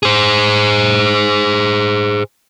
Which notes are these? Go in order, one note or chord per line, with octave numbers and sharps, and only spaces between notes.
G#4 C5